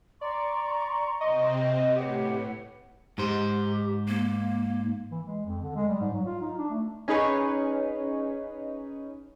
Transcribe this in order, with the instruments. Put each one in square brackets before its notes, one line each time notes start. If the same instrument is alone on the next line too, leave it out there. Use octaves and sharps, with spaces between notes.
[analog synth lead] D5 [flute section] A#5 C6 C#6
[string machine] C3 C4 [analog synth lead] D#5
[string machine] A2 [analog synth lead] G4 [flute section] B4 C#5 F#5
[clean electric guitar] G#2 C5 [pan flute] G4
[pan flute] A#3
[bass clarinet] E3
G#3
F2
D3
G#3
G3
G#2
F#3
F4
D#4
D4
A3
[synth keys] C#4 D#4 G#4 B4 C#5